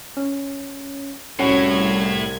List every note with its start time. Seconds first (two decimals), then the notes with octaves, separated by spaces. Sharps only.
0.17 C#4
1.39 C2 A2 C#4 F#4 C#5 G#6